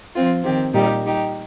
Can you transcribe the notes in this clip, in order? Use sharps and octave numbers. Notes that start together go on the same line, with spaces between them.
F3 C4 F4
D#3 C4 G4
A#2 G3 D#4 G4
G3 D#4 G4